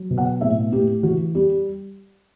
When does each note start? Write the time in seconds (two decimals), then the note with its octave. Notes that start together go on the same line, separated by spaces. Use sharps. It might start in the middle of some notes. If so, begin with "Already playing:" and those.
Already playing: F#3
0.10 B2
0.18 F#5
0.41 A2 E5
0.72 A2 G4
1.03 E3 F#4
1.35 G3 G4